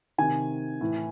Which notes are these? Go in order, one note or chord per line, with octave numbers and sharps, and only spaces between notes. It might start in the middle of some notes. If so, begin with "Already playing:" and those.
C3 D#3 G#5
A2 E3